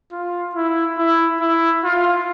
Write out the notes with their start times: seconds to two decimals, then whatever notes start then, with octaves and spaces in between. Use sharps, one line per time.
0.12 F4
0.55 E4
0.98 E4
1.40 E4
1.84 F4